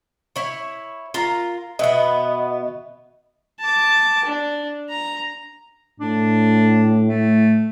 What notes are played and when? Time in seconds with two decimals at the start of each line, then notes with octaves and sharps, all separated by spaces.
0.36 E4 C#5
1.14 F4 A#4 A#5
1.79 B2 B3 D#5 E5
3.61 A5 D6
4.25 D4
4.89 A#5
6.00 A2 D4
7.08 A3